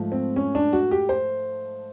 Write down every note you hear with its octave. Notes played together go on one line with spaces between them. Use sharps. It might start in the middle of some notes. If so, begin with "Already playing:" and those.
Already playing: G#2 F3 A3
C4
C#4
D4
F#4
G4
C5